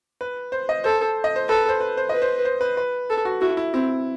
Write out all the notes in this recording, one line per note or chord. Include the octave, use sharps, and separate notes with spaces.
B4
C5
D#5
A4 C5
D#5
C5
A4 B4
C5
B4
C5
B4 D#5
C5
C5
B4
B4
A4
F#4
E4 F#4
E4
C4 E4